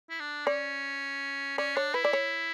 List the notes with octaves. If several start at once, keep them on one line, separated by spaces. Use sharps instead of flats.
E4
D4
C#4 D5
C#4 D5
D4 C#5
E4 B4
D5
C#5